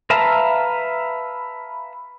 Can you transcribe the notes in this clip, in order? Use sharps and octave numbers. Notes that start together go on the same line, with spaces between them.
B4 E5 F5 A5 A#5